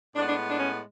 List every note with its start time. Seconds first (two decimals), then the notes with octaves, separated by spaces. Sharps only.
0.15 A2 G#3 B3 D4
0.27 D4
0.49 D4
0.60 C#4